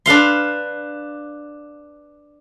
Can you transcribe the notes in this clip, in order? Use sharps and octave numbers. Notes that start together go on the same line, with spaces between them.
D4 B4 F5 C6